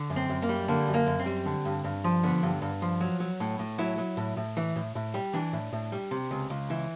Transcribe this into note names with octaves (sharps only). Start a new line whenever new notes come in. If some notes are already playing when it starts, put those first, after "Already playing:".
Already playing: D3
F#2
C4
F#2
A#3
G3
D3 A#3
F#2
A#3
F#2
C4
G3
D3
G2
G2
F3
D3 B3
G2
G2
F3
F#3
F#3
A2
A2
F#3 E4
F#3
A2
A2
E3
A2
A2
G3
E3 D4
A2
A2
G3
C3
C#2
C#2
E3